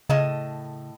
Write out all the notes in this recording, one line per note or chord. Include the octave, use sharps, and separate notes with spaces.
A2 C#3 D#5 A5